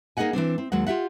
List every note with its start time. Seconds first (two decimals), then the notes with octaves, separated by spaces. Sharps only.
0.17 A#3 D#4 G#4 D#5 F#5 G#5
0.33 E3 F3 C4 D4
0.58 C4
0.72 D#2 F#3 G#3 F#5
0.87 F4 G4 E5 F#5